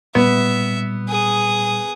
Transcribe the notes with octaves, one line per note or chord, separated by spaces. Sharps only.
A#2 G3 B3 E5
G#4 D#6